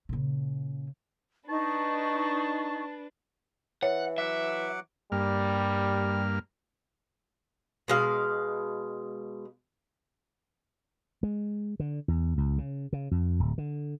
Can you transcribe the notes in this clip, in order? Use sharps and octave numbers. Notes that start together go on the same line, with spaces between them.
A#2 C#3
D4 D#4 B4 A5 C#6
E3 C#5 F#5
F#3 E5 F#5 D6
G2 G3 A#3 F6
B2 G#3 F5
G#3
D3
E2
C#2
C#3
C#3
F2
D1
D3